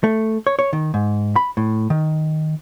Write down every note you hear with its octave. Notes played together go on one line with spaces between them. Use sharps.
A3
C#5
C#5
D#3
G#2
B5
A2
D#3